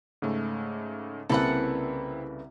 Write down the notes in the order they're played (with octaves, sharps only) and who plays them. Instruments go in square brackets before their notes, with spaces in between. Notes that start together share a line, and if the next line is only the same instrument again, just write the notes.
[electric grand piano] G#2 C#3 A3
[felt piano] C2 C#3 A#3 [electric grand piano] C4 E4 [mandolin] A4 B4 F#5